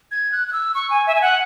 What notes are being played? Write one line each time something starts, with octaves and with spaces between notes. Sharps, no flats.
G#6
F#6
F#6
E6
C#6
G#5
E5
G#5
F#5